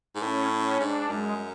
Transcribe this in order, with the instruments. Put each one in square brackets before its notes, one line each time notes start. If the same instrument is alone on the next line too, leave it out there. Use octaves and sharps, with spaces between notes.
[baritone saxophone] G#2
[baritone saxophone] A2 [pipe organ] C#4
[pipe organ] C#4
[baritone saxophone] G#2 [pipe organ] D4
[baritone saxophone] F#2 [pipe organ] G#3